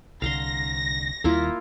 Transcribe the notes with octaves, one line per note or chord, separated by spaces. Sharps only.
C2 D3 F5 A#5 C6 A#6
D#2 D#3 G3 A#3 E4 F4